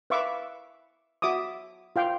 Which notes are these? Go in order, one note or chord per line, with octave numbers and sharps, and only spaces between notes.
B4 E5 F5 C#6 D6 E6
F#4 E5 D6 D#6
F4 F5 G5